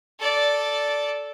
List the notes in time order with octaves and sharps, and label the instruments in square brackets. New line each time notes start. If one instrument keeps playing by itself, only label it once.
[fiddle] A4 D5